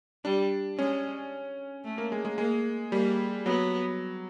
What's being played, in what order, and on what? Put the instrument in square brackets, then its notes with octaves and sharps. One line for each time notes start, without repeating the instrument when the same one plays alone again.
[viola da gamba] G3 [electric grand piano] D4
[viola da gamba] G#3 [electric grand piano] C#4
[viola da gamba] A3
[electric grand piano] A#3
G#3
G#3
[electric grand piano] G#3 [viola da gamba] A#3
[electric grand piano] G3 [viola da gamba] A#3
[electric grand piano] F#3 [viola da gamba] B3